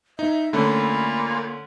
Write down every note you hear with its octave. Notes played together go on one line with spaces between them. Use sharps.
D#4 E5
A#2 D3 A3 C#4 B5